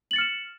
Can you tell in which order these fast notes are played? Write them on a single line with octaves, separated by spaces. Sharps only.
F#7 A6 C#7 F6 E7